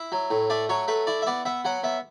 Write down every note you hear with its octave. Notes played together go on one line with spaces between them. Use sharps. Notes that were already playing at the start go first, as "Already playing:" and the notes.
Already playing: E4 E5
F#3
A2
A3 D5
F#3 C#5
A3 B4
E4 D5
E5
B3 D5
B3 E5
F#3 F#5
B3 E5